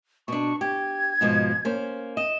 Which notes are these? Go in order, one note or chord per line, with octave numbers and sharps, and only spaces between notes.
B2 D4 C#6
G4 G#6
G#2 B2 F3
A#3 C#4 C5
D#5 E7